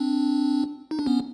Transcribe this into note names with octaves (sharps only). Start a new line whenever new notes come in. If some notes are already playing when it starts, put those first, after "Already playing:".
Already playing: C4 D4
D#4
D4
B3 C#4